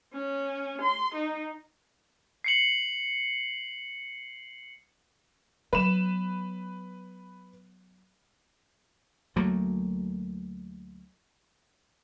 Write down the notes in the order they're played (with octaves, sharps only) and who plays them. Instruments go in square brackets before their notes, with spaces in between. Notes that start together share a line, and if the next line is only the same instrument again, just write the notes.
[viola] C#4
C6
D#4
[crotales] C7 C#7 F#7
[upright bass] F#3 B3 [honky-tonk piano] B4 E7
[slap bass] D2 F#3 A3 A#3